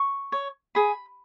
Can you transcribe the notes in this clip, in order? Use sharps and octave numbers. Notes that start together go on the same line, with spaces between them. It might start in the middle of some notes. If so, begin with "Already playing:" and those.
Already playing: C#6
C#5
G#4 B5